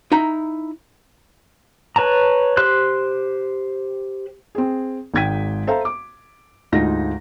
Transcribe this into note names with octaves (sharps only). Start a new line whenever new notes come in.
D#4 E4 A#5
B4 C#5 A5 A#5
G4 C5 C6 F#6
C4 G#4
G#1 G#2 G5 G#6 B6 D#7
A4 C5 E5 F5 A#5
D6
D2 G#2 D#4 F4 F5 A#6